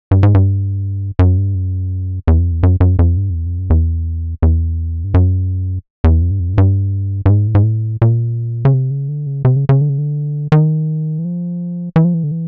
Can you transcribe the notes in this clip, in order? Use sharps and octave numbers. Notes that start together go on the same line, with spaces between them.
G2
G#2
G2
F#2
G2
F#2
E2
F2
E2
F#2
F#2
F2
G2
F2
E2
F2
F#2
E2
E2
G2
F#2
E2
F2
G2
F2
F#2
G#2
G2
G2
G#2
A2
G#2
A2
A#2
C#3
C3
C#3
D3
C#3
C3
C#3
C#3
D3
C#3
D3
D#3
E3
F3
E3
F3
E3
D3
E3